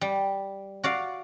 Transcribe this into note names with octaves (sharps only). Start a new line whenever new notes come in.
G3
F#4 D5 F5